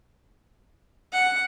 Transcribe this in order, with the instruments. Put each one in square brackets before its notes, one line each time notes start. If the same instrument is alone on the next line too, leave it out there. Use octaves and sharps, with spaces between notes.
[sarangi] F#5